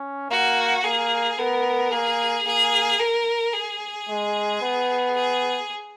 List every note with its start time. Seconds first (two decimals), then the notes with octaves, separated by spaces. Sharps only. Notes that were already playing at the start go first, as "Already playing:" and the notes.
Already playing: C#4
0.30 A#3 F#4
0.84 A#3 G#4
1.39 B3 A#4
1.92 A#3 G#4
2.47 A#3 G#4
3.00 A#4
3.54 G#4
4.09 G#3
4.62 B3
5.16 G#4